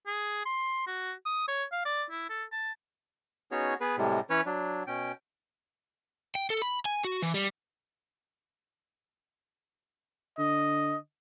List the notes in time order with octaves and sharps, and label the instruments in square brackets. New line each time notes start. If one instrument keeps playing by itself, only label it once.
[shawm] G#4
C6
F#4
D#6
C#5
F5
D5
E4
A4
A5
[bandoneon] B3 C#4 D#4 F#4 G#4 C#5
B3 G#4 B4
A2 C3 G3 G#3
E3 C#4 B4 C#5
F#3 D4
B2 C#4 G5
[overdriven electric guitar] G5
A4
B5
G#5
F#4
E3
G3
[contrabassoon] D3 [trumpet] D#5